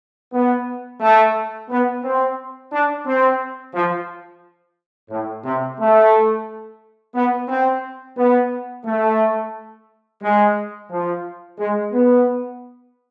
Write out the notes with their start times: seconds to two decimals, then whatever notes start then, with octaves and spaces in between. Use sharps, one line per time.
0.32 B3
1.00 A3
1.69 B3
2.03 C4
2.72 D4
3.05 C4
3.73 F3
5.10 A2
5.44 C3
5.78 A3
7.14 B3
7.48 C4
8.16 B3
8.84 A3
10.21 G#3
10.90 F3
11.58 G#3
11.91 B3